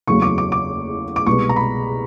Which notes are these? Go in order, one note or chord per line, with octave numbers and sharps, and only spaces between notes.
F#1 E2 C#3 F#3 A3 C#6
D6
D6
D6
D6
C2 B2 G#3 B3 C#6
A#5
B5